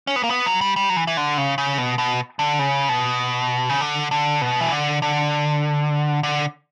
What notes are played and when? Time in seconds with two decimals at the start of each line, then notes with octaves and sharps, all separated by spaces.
0.07 C#4
0.16 B3
0.24 A#3
0.31 B3
0.46 F#3
0.61 G3
0.76 G3
0.90 F#3
0.97 E3
1.07 E3
1.17 D3
1.38 C#3
1.58 C#3
1.78 B2
1.98 B2
2.39 D3
2.59 C#3
2.89 B2
3.69 C#3
3.81 D3
4.11 D3
4.42 B2
4.61 E3
4.72 D3
5.02 D3
6.23 D3